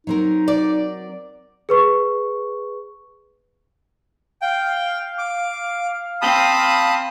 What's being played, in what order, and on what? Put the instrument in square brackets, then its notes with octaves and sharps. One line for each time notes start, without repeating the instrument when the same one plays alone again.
[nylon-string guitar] F#3 C4 A#4 [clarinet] D#4
[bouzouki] D5
[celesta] G#4 B4 C#6
[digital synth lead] F5 [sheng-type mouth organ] G5
[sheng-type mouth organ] D6
[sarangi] C4 [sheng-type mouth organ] A5 B5 D#6